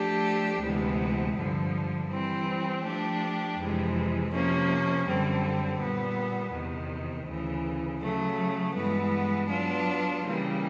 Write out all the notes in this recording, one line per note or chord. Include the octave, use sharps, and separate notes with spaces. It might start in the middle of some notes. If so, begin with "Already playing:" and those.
Already playing: F3 A3 D4 G4
D2 C3 E3 G#3 B3
G2 D3 F3
E3 G3 C4
F3 A3 D4 G4
F2 C3 E3 G#3
C3 F3 A#3 C#4
F#2 D3 G3 C4
A#2 G3 B3
E2 C3 D#3
D2 C#3 E3
C#3 F#3 A3
G2 E3 G#3 B3
F#3 B3 D4 F4
C#3 E3 G3 A#3